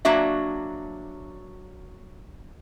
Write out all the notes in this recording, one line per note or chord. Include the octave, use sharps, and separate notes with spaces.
F#3 A#3 D4 F#4 E5